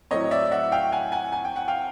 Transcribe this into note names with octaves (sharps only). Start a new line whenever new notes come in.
A2 F#3 A3 C4 C#5 D#5
D5 E5
E5 F#5
F5 G5
F#5 G#5
F#5 G#5
G#5
G5
F#5
F5 G5